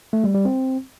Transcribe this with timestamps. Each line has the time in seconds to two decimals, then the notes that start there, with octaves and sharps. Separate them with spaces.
0.13 A3
0.24 G3
0.34 G3
0.45 C4